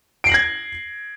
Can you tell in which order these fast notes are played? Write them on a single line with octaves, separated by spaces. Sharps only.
D7 C7 F#7 A#6 G#6